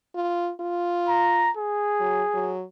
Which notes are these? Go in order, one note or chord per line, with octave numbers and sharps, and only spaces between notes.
F4
F4
A#5
G#4
F#3
F#3